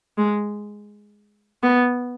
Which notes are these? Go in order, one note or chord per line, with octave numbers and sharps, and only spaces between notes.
G#3
B3